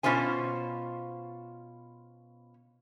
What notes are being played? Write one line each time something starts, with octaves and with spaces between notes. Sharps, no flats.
B2 C#4 F4 C5 G#5